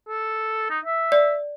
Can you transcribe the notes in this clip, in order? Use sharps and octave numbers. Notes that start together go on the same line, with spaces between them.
A4
D#4
E5
D5